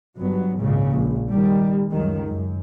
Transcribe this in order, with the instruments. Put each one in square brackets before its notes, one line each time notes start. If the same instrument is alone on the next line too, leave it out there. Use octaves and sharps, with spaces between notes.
[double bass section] G1 G2 F#3 B3
G#1 C#2 A#2 C#3
A#1
D#3 G3
C#2 F#2 D#3
F#2